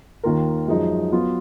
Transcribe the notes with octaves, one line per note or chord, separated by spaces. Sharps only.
D#2 D#3 A#3 F4 A#4
F#2 F3 G#3 D#4
F#3 B3 F4